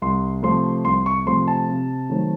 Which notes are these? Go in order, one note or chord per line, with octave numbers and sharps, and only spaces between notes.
C2 C6
C3 F3 A3 C6
C2 C6
C#6
C3 F3 A3 C6
A5
C3
D#3 F#3 A3 C4